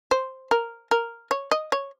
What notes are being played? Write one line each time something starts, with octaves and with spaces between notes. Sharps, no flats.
C5
A#4
A#4
C#5
D#5
C#5